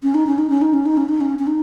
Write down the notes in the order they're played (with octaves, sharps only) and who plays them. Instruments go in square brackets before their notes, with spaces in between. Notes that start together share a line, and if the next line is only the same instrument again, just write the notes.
[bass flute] C#4
D#4
C#4
D#4
C#4
D#4
C#4
D#4
C#4
D#4
C#4
C#4
D#4